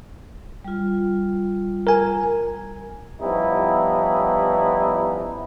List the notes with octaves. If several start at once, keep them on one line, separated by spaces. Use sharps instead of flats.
G3 F4
A#4 G#5
F3 G3 B3 C#4 D#4 E4